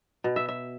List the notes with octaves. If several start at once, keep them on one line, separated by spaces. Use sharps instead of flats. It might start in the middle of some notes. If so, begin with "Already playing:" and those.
B2
E5
E5